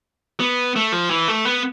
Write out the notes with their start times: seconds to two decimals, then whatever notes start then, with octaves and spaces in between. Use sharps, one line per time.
0.40 B3
0.76 A3
0.92 F3
1.11 E3
1.28 A3
1.45 B3